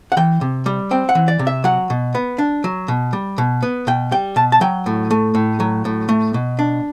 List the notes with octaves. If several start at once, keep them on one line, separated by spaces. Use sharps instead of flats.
F#5
E3 G5
C3
G3
C4 G5
F#5
E3
D5
C3
E5
F#3 F#5
B2
B3
D4
F#3
B2
G3
B2
B3
B2 G5
G3 G5
B2 A5
A5
F#3 G5
A2
A3
A2
F#3
A2
A3
B2
D4